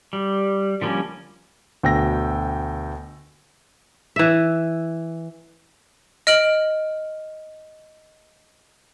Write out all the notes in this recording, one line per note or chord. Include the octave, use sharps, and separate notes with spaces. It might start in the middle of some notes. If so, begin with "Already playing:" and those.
G3
D3 F3 G3 A#3 C#4
D2 B2 G5 E6 A#6
E3 E5
D#5 F6 D7 F#7